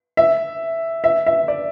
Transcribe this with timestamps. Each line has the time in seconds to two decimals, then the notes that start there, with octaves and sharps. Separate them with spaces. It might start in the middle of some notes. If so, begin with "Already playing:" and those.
0.17 E5
1.04 E5
1.27 E5
1.48 D5